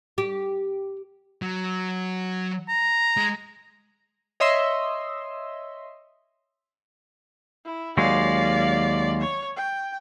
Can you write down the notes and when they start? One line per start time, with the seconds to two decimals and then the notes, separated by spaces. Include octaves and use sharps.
0.18 G4
1.42 F#3
2.68 A#5
3.17 G#3
4.40 C#5 D#5 E5 C6 E6
7.65 E4
7.98 D#2 F#3 G#3 D5 F5
9.21 C#5
9.56 G5